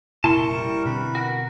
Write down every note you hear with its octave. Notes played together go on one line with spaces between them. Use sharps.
F1 A#2 C#3 E4 A#4 A5 C6 C#6
G3
B2 D3 C4 B4
F#4 A#4